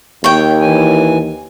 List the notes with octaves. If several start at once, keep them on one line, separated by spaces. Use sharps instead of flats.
D#2 C#5 G5
E3 G#5